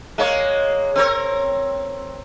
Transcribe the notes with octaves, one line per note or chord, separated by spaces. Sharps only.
G#3 A#3 C#5
C4 A#4 C#5